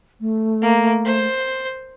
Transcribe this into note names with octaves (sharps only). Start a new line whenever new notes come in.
A3
A#3
C5